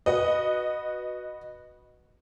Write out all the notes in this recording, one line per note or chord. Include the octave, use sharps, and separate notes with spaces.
F#4 B4 D#5